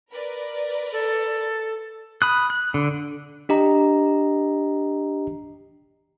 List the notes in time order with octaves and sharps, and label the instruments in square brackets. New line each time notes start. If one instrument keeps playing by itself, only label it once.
[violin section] A#4 B4 D5
[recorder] A4
[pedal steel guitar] B5 D#6 F#6
F#6
D3
[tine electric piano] D4 G4 D#5 A#5